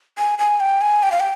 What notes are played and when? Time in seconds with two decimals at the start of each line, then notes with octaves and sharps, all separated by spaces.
0.18 G#5
0.39 G#5
0.60 G5
0.81 G#5
1.03 G5
1.12 F5
1.20 G5